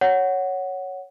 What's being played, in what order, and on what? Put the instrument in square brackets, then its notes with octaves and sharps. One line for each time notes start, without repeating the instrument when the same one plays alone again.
[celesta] C#5 F#5